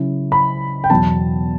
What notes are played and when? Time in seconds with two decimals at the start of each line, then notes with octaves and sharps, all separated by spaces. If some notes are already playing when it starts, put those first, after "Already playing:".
Already playing: C#3 F#3 C#4 E4
0.32 B5
0.84 G5
0.90 E2 B2 F#3 B3 A5